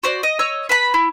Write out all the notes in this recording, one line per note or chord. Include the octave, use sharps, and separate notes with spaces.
F#4 C5 D5
D#5
C#5 D#5 E6
B4 A5 B5
E4